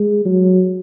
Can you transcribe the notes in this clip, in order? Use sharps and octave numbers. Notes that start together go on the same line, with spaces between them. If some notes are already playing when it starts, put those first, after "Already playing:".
Already playing: G#3
F#3